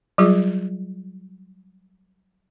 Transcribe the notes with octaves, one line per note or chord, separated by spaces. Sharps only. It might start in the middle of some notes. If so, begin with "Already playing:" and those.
F#3 G3 F4 G#4